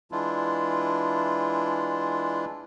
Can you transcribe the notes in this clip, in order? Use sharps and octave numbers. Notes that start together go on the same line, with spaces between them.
E3 G#3 D4 E4 F4